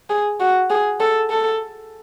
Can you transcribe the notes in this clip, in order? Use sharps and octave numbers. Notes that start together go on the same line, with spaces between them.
G#4
F#4
G#4
A4
A4